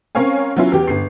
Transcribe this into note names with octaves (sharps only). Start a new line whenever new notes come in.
C4 C#4 A#4 C#5 F5 G#5
F#3 B3 C#4 E4 F4
E2 G4
G1 C7